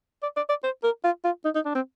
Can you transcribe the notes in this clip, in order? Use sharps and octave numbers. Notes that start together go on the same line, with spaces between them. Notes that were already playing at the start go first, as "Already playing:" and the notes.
D5
D5
D5
C5
A#4
F4
F4
D#4
D#4
D4
C4